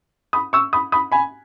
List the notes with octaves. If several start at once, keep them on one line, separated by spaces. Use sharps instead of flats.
B5 D#6
C#6 E6
B5 D#6
B5 D#6
G#5 B5